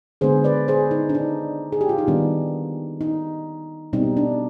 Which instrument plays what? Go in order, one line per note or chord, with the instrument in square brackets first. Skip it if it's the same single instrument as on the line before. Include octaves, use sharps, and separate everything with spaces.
[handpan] D3 G#3 B3 G#4 C5
B4 D5
G#4 C5
D#4
D4
D#4
G#4
G4
F4
D#4
D#3 G3 B3 D4
D#4
B2 G3 C4 D#4
D4